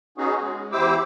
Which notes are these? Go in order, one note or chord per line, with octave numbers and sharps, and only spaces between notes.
B3 C#4 D#4 F#4 G#4
G#3
E2 E4 G4 C5 D6 E6